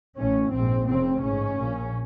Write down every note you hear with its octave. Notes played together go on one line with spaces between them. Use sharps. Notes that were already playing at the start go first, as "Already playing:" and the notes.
A1 A2 C#4
A#1 G#2 C4
F1 F2 C#3 C4
A1 G#2 C#4
A#1 A#2